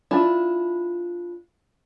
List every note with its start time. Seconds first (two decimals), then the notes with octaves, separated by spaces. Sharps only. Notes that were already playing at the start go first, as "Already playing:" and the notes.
0.11 D4 E4 F4